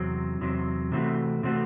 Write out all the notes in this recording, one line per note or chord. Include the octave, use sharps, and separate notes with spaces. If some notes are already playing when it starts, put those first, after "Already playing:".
Already playing: E2 C3 F#3 C4
E2 C3 F#3 C4
C3 E3 A3 C4 F#4
C3 E3 A3 C4 F#4